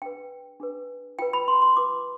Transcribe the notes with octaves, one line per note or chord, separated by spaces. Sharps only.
D4 G#4 B4 G5
D4 G#4 B4
F4 B4 G5
B5
C6
C6
F4 B4 D6